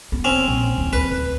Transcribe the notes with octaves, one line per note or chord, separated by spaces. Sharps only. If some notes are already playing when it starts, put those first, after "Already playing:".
B3
C4 C#4
A#1
D#2 E3
D2 B4